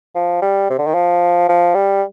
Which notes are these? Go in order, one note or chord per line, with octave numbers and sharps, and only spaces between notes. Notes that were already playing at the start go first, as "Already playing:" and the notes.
F3
G3
C3
D3
D#3
F3
F3
G3